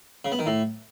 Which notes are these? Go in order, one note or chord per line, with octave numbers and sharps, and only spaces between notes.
C#3
B3
D#3
A2